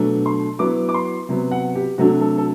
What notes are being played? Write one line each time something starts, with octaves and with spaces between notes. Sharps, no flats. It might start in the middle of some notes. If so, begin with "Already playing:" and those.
Already playing: B2 F#3 A3 D4
C6
F#3 B3 E4 D6
D6
C6
C3 F#3 B3
F#5
G4
C3 F#3 A3 D4 F#4
A4
A4